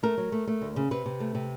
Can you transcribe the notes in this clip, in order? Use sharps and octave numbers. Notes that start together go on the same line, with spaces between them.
A3 A#4
F#3
A3
A3
D2
C#3
C3 B4
C3
A3
C3